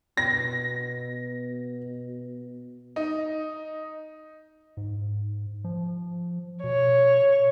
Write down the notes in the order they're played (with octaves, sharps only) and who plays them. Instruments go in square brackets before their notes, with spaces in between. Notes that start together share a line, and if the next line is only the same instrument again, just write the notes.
[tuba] B2 [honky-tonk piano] A#6
[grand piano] D#4
[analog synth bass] G#2
F3
[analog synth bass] B2 [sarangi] C#5